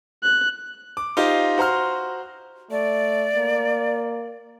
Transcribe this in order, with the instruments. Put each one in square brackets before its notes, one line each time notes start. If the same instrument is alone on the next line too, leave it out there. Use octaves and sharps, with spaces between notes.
[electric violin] F#6
[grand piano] D6
D#4 F4 G4 C5 F5
F#4 C5 A#5 C6 F6
[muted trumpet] A3 [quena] D5
[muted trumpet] A#3